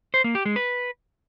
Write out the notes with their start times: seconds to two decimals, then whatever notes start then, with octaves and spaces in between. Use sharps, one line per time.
0.14 C5
0.24 A#3
0.35 G4
0.45 G#3
0.56 B4